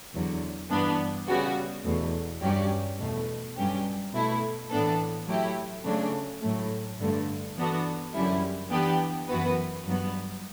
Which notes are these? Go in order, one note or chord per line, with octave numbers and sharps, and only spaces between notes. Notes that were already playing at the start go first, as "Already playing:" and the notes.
E2 D3 F#3
G2 E3 B3 D4
C#3 G3 B3 F#4
E2 B2 A3
G2 F#3 C#4 G4 D5
E2 B2 A3
G2 F#3 C#4 G4
B2 A3 E4
A2 E3 B3 D4 A4
F#3 A3 E4 G4
C#3 F#3 A3 D4
A2 F#3 A3
G2 D3 A3
E3 B3 D4 F#4 A4
F#2 D3 G3 C#4 E4
E3 B3 D4 G4
F#2 E3 B3 F#4 B4
G2 F#3 B3